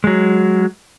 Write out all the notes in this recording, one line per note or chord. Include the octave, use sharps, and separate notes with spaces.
F#3 G#3